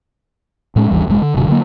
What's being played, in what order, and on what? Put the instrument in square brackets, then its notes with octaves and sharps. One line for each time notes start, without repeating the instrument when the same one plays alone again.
[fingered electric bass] A2 G#3 C#4
G#1 D#2 E3 G3
F1 G#2 C#3 G#3
D3
D#1 G2 B2 D3
D3 F#3 G3 A#3